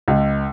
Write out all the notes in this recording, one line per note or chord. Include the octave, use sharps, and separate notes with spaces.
C#2